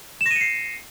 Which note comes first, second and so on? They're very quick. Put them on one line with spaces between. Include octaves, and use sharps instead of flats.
E7 A#6 D#7 C#7 C7